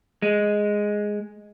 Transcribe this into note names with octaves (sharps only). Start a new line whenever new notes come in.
G#3